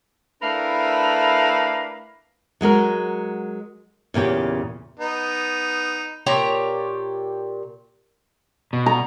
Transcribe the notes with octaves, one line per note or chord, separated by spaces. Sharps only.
A3 D4 E4 A#4 B4 F5
F#3 G#3 F#4 A#4
E2 A#2 C#3 G4
B3 D#4
A#2 G4 C#5 A#5
B2
A#5